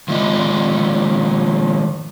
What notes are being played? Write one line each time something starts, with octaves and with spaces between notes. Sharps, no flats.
D#3 F3 G#3 D#5